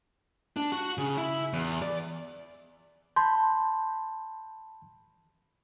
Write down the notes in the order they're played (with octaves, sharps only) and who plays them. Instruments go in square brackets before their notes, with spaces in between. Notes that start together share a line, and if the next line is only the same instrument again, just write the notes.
[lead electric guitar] D4
F#4
C#3
E4
E2
D5
[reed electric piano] A5 B5 G6 [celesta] C6